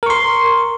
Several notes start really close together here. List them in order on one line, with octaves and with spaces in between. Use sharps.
A#4 C#6 C6